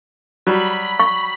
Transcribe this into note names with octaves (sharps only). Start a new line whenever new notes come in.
F#3 G3 B5
C#6